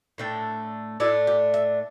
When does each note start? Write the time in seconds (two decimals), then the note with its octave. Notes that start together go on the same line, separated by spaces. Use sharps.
0.18 A2 A3 D4 G5
1.00 A2 A3 D4 E4
1.27 G4
1.54 E5